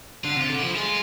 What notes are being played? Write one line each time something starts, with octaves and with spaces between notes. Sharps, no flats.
D3 F4
C3 F4
D3
F3 E4
G#3 F4